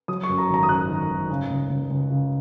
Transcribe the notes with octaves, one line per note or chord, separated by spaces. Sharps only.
F#3 D#6
C#6
F#2
A#5
G#1 A#5
D#6
F#2 F#6
D#3
G#1
C#3
C#2
C#2
C#2
C#3